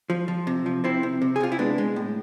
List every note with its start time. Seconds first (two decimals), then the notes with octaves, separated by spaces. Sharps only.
0.10 F3
0.28 F3
0.47 C3
0.66 F3
0.84 C3 C4 E4
1.03 C3
1.22 C3
1.36 G#4
1.40 C3 F4
1.52 E4
1.59 G#3 B3 D4
1.78 G#3
1.96 A2